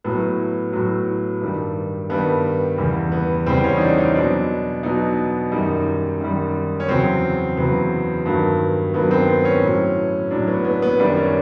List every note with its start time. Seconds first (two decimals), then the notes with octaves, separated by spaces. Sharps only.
0.04 A2 F#3 B3
0.73 A2 F#3
1.41 G2 D#3 G3
2.10 G2 D#3 G3 B3
2.78 E2 C#3 E3 G3
3.12 B3
3.46 E2 C#3 E3 G3 C4
3.64 C#4
3.76 D#4
3.81 D4
3.98 D#4
4.15 B2 F#3 D4
4.83 B2 F#3 D#4
5.52 F#2 D#3 G3 D#4
6.20 F#2 D#3 G3
6.80 C#4
6.89 E2 C#3 F#3 C4
7.57 E2 C#3 F#3 B3
8.26 G2 D#3 F#3
8.94 G2 D#3 F#3 B3
9.11 C4
9.28 B3
9.45 C#4
9.63 A2 F#3
10.31 A2 F#3 D4
10.48 B3
10.65 B3
10.82 B3
10.99 F#2 D#3 G3 D4
11.17 C#4